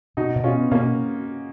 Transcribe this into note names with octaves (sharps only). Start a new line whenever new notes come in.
B2 D#4 F#4
B2
C#4 F4
B3
B2 A#3 C#4